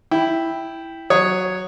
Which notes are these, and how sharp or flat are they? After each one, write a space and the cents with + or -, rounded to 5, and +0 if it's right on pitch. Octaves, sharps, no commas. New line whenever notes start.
E4 +0 G5 +0
F#3 +0 C#5 +0 D#6 +0